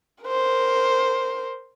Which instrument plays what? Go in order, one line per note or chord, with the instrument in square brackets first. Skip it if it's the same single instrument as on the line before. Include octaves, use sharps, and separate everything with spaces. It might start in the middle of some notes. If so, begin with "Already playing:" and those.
[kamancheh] A#4 C5